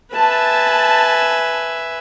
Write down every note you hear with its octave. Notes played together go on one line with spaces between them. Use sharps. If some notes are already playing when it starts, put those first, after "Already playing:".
B4 E5 G#5 A5